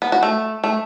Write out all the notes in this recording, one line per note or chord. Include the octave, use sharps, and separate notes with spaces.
B3
F#4
A3
A3